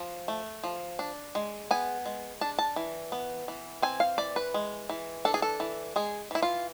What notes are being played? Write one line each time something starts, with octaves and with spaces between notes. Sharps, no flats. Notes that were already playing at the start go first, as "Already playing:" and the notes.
Already playing: F3
A3
F3
D4
G#3
B3 G#5
G#3
D4 A5
A5
E3
B3
E3
C4 G#5
F5
E3 D5
B4
G#3
E3
D4 A4
G#4
A4
E3
G#3 G#4
E3 E4
F4